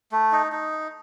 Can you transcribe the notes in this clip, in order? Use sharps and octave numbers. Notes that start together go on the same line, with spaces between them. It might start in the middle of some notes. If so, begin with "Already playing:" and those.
A3
D#4
D#4